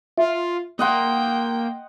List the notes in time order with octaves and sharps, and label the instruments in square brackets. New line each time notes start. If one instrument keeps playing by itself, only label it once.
[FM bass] F4 [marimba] E5
[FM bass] A#3 [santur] D#5 F#5 C6 [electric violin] G5